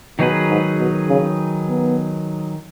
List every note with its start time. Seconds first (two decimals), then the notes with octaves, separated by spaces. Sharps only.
0.19 B2 D#3 F#3 D#4 G#4 B4
0.49 G#2
0.79 B2
1.09 C#3
1.69 B3